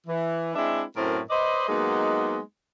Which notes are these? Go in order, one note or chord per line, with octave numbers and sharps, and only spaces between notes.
E3
G#3 C4 D4 E4 D#5 E5
F#2 A2 C4 A#4
B4 C5 D5 D#5
F#3 G#3 A#3 B3 D#4